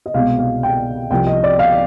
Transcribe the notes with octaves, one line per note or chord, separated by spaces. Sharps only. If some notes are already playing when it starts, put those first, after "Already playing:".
D#5
C2 B2 G#3 F5
F5
G5
C2 C3 F3 G5
D#5
D5
F5